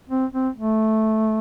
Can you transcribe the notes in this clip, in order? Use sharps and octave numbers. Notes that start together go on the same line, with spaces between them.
C4
C4
A3